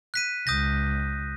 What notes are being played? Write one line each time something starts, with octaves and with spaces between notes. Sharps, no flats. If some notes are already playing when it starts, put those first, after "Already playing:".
F#6 B6 D#7
C#2 D#6 G6 A#6